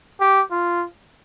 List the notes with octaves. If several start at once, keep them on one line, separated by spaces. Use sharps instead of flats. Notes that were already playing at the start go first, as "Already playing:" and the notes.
G4
F4